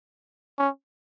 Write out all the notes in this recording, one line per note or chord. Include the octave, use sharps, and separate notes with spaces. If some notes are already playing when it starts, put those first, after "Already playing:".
C#4